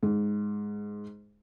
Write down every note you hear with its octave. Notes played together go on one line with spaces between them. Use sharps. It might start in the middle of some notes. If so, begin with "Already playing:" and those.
G#2